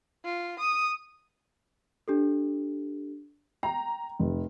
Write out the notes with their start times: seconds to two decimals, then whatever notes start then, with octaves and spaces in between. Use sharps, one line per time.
0.24 F4
0.59 D#6
2.08 D4 G4 A4
3.63 G5 A#5
4.20 F1